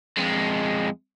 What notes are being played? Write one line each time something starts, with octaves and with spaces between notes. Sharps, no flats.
F2 G#3